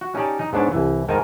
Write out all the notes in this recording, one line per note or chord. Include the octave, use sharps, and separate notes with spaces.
F#4
C#4 D#4 G4 C#5 D5 A5
D#4
G#2 B3 D4 C#5 A5
C2 E3
G#2 D#3 D#4 A#4 G#5 A5